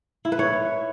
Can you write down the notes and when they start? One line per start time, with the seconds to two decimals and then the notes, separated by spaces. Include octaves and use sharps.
0.25 E4
0.32 B4
0.39 C#5